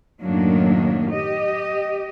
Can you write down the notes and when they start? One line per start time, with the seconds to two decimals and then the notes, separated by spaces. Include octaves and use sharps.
0.21 F#2 A2 D#3 F#3 A#3 D4
1.11 G4 D#5